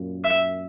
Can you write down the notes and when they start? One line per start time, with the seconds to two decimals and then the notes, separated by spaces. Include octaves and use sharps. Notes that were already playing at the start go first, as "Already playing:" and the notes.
Already playing: F#2 A#2
0.25 E5